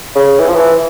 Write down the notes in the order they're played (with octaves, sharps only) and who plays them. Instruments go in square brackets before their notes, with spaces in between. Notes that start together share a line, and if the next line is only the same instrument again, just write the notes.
[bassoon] C#3
E3
F3
E3